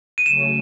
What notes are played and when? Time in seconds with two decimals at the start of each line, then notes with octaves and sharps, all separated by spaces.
0.18 D#7
0.26 C#3 F#3 A3 C#4 E7